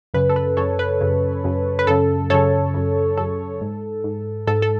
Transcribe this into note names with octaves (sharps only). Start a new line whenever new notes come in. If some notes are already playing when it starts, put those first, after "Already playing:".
F#2 C#3 B4
A4
B4
F#2 C#3 A4 C#5
B4
F#2 C#3
F#2 C#3
B4
F#2 C#3 A4
F#2 C#3 A4 C#5
F#2 C#3
F#2 C#3 A4
G#2
G#2
G#2 A4
A4